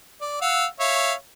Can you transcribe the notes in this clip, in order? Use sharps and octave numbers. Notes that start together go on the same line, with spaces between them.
D5
F5 F#5 E6
C#5 E5 F5